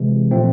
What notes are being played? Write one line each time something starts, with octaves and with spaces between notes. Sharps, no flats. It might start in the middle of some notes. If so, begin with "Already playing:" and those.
Already playing: C3 E3 G#3
A#2 F3 A3 C4